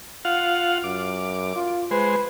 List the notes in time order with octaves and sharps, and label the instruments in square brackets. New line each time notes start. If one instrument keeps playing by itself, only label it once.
[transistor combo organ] F4 F5 F#5
[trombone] F#2 [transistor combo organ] D6
[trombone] F4
[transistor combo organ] G#3 C5 [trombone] B4